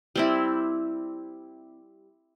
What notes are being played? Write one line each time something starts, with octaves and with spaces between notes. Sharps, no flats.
G3 C4 E4